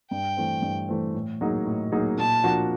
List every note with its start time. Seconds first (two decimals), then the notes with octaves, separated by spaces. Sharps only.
0.10 G2 G5
0.37 E3 A3 C4
0.62 G2
0.89 E3 A3 C4
1.15 A2
1.41 F#3 A#3 D#4 G#4
1.66 A2
1.92 F#3 A#3 D#4 G#4
2.18 A#2 A5
2.44 F3 A#3 D4 F#4